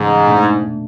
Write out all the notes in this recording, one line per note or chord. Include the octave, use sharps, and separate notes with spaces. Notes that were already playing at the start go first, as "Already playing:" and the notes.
Already playing: G#2 C#3 E3 A3 C#4
B2 A3 D4